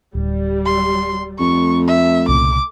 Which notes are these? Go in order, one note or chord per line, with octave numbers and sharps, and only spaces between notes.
D1 G3
C6
F2 A3 C#6
E5
C2 A#2 C#3 D6